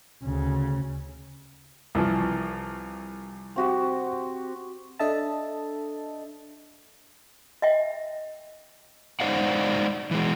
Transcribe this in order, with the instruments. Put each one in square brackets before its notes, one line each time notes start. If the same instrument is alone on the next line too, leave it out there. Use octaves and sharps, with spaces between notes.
[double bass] D2 C#3
[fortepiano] C2 E3 F3
[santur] C4 F#4 G4
[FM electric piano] D4 A4 D#5 E5 A5
[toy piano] D#5 E5 G5
[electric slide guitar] G#3 D#4 C5 D5 F5 F#5
E3 G#3